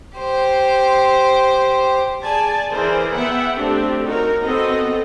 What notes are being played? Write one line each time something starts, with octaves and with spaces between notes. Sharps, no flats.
G4 C5
G#4 D5 G#5 A5
E3 G#4 A#4 C5 D5
B3 E5 F#5 G5
A3 C4 D4 G4
D#4 F#4 A#4 C#5
B3 C4 F#4 A4 D#5